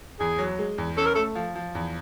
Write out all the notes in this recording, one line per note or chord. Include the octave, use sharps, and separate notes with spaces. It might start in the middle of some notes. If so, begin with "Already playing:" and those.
E2 G#4
F#3
G#3
E2
C#4 A4
A#4
A3 A4
F3
F3
E2